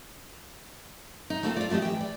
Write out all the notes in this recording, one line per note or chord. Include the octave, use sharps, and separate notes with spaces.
D#4
A3 A#3 C4 E4 F4 A4
F4 D5
E3 A3 F#4 G4 D#5
E3 G5
D5